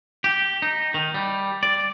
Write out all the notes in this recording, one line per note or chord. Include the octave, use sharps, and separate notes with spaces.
G4
D#4
D#3
G3
D5